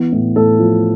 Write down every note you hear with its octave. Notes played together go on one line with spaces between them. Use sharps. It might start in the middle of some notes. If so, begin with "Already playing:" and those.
Already playing: E3 B3
A2
A2 A4
F3